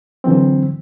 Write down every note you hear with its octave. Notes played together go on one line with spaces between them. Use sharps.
D3 E3 F#3 C4